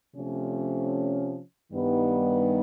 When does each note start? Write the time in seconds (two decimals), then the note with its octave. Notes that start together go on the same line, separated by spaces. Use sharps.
0.15 C3 F3 A3 C#4
1.72 G2 D#3 G3 B3 D#4